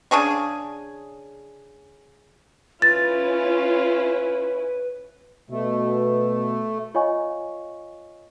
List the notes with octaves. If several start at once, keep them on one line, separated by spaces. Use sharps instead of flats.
C#3 D4 G#4 C#6
C#4 E4 F4 B4 A6
B2 A3
F4 C#5 D#5 F5 G#5 C#6